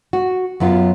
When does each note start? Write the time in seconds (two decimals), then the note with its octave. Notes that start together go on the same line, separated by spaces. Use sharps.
0.13 F#4
0.60 F#2 F#3 B3 F4